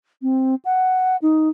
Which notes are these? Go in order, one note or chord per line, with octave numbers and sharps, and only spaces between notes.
C4
F#5
D#4